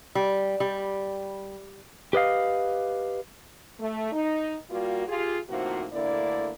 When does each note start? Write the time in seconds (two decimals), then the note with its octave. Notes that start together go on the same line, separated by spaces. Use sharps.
0.15 G3
0.60 G3
2.13 G4 B4 D#5 F5
3.80 A3
4.12 D#4
4.70 G3 A#3 F4 F#4
5.08 F4 G4 G#4
5.49 A2 C3 F3 A#3 D#4 F#4
5.93 D2 D3 A3 A#3 E4 D5